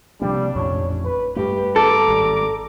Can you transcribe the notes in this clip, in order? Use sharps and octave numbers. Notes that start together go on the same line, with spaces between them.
C3 F3 G3 A#3 D4
A1 F2 A#2 C#5
B4
G2 A3 G4 B4
A4 A#5 D6
G#1 G3